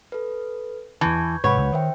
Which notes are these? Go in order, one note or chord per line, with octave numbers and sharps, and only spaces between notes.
A4 B4
E2 E3 A5 C#6 G6 G#6
G#2 C3 B4 C#5 F#5 B5
C#2
D#3 C5 E5 G5